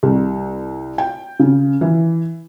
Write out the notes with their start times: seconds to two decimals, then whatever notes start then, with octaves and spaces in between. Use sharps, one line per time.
0.03 C2
0.98 G5
1.39 C#3
1.81 E3